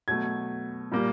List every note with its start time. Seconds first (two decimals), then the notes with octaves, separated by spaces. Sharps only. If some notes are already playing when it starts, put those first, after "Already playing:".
0.08 B2 F#3 A3 G#6
0.92 A#2 G3 A#3